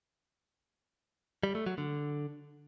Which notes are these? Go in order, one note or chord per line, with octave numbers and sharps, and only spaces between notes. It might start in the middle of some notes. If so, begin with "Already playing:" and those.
G3
A3
F#3
D3